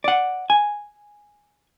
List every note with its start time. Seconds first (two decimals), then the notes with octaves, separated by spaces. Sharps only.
0.04 D5 F#5
0.50 G#5